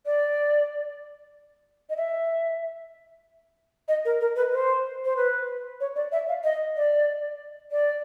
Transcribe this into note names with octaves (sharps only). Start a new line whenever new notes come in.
D5
D#5
E5
D#5
A#4
A#4
B4
C5
C5
B4
C#5
D5
E5
F5
D#5
D5
D5